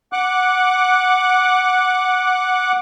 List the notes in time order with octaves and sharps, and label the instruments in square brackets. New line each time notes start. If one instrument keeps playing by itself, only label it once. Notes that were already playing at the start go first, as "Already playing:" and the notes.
[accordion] F#5 D6 F#6